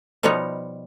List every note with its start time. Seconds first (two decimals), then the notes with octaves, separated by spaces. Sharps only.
0.23 B2 F3 G3 B3 D#4 C#5